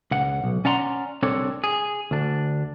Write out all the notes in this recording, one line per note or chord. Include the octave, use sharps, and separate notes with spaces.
C#2 F#5
B1
C#4 D5 F#5 A#5 C6
C2 C4 D4 A4 C#5
G#4
D2 D4